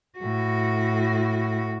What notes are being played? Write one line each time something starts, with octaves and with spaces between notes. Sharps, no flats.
A2 F#4